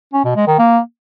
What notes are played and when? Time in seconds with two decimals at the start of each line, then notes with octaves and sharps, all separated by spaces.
0.13 C#4
0.25 B2
0.36 G#3
0.47 D#3
0.59 A#3